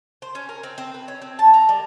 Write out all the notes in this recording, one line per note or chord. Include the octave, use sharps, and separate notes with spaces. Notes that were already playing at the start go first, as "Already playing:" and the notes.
C5
C#4
A#4
C4
C4
B4
C#4
C4
A5
A#5
G3